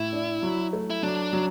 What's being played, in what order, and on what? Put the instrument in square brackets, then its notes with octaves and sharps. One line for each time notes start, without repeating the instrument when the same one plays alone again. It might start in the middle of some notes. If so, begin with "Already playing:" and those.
Already playing: [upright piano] A2 [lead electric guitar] E4
[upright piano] D4
F#3
A3
[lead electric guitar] E4
[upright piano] F#3 [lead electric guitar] D4
[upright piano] F#3